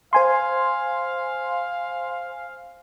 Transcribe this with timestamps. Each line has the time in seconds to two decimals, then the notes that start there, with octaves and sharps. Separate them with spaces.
0.13 C5 F5 G#5 C6